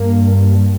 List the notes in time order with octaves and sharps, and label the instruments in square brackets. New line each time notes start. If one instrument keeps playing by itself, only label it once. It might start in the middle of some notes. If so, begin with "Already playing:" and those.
Already playing: [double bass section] G2 A#3